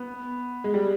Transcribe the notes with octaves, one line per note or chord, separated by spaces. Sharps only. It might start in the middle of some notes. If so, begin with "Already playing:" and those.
Already playing: B3
G#3
G3